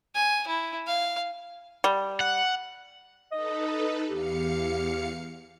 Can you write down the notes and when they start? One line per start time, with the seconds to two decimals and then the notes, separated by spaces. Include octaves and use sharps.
0.15 G#5
0.47 E4
0.87 F5
1.84 G3
2.21 F#5
3.32 D#4 A4 B4 D#5
4.09 E2 G4 F5 C#7